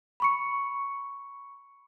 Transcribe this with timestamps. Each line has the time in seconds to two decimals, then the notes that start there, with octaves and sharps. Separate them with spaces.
0.20 B5 C#6 C#7